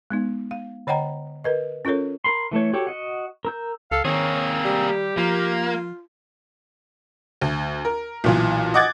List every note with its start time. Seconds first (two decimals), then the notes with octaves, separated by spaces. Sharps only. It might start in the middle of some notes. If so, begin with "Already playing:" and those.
0.10 G#3 B3 D#4
0.51 F5
0.87 D3 C#5 D#5 F#5 G5 A#5
1.44 A#4 B4 D#5
1.85 C#4 F4 A4 A#4 C#5
2.24 A#4 B5 C6
2.51 E3 A3 A4 C#5
2.73 F#4 G4 A4 C#5
2.87 F#4 D#5 F#5
3.45 A#4 E6 G6
3.91 C#2 A4 F5
4.05 D#3 A#3 C4 G#4 C#5
4.65 G3
4.89 G4
5.17 F3 A#3 F4
7.41 D2
7.85 A#4
8.24 B1 A#2 E3
8.74 D#5 F#5 D6 F#6 G#6 A6